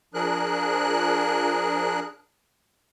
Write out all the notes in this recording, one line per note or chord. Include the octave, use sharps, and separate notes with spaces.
F3 D4 G#4 A#4 F#6